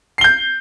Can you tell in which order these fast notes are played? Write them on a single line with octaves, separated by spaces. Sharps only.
C7 G7 G6